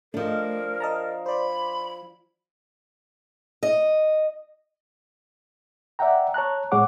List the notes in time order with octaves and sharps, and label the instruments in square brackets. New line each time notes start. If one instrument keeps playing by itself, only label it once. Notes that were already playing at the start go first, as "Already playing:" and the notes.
[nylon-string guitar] F3 D4 [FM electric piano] A3 D#5 [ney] A#4
[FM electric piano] D#5 A5 A#5
[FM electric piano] C5 D5 [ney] B5
[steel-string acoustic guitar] D#5
[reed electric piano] D5 E5 F#5 G5 A#5
C#5 A5 A#5 F#6
A2 G#3 G#4 C#5 F#5 D6